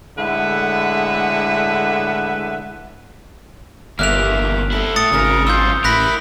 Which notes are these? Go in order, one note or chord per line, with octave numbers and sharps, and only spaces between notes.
A2 D3 G#3 B4 E5 F#5
G1 E2 A#3 E5 F6 F#6 F7
C4 E4 A4
A2 D#6 A6 C#7
G#1 C#3 A#4
F#2 F4 C5 E6 G6
A1 E4 A#4 B5 F#6 A#6 B6